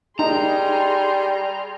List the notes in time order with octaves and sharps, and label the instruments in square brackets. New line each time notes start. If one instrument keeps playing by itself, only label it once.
[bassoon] G3 [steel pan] D#4 [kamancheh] G#4 C6 [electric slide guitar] A#5